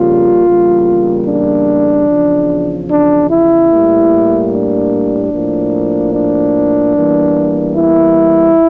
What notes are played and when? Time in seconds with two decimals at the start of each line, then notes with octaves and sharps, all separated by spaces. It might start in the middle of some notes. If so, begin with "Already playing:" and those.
Already playing: F2 C#3 G3 A#3 F4
0.46 E2 C#3 G3 A#3
1.27 D4
2.08 E2 C#3 F3
2.89 D4
3.30 E4
3.71 A2 G3 A#3
4.52 D4
5.33 A2 F3 A#3
6.14 D4
6.96 E2 E3 G3 A#3
7.76 E4